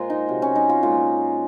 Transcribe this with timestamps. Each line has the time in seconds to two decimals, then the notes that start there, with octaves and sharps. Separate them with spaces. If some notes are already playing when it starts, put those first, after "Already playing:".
Already playing: A#2 G#3 F4 G#4 A#4 C5
0.10 D#4
0.29 C3 F#3
0.42 C#4
0.55 D#4
0.69 F4
0.82 A#2 G#3 F4